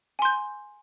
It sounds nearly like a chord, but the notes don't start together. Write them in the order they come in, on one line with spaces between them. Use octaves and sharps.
G#5 C6 G6